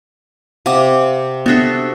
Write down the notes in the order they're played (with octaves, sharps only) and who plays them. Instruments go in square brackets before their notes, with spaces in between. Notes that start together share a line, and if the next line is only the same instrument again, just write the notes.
[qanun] C3 [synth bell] F5 F#5 D6
[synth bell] B3 D4 [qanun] F#4 A4 E5